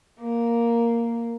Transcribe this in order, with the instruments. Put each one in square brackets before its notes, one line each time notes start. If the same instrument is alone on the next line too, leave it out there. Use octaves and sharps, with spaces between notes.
[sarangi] A#3